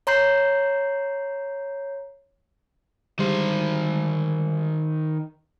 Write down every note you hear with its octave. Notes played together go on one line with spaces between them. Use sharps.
C#5 A#5 C6 G6 C7
D3 D#3 G3 G#3 C5